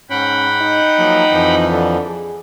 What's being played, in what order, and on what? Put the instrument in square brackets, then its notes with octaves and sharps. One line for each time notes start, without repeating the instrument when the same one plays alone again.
[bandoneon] G#2 [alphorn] C#4 [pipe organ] F#5 G5 B5
[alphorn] D#4
[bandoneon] F3 F#3 A#3
F2 E3 F3
[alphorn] D3
G#4